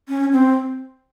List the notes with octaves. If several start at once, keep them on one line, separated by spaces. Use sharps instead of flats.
C#4
C4